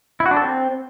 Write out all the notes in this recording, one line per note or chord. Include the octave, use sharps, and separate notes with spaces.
E4
F#4
D4
A4
C4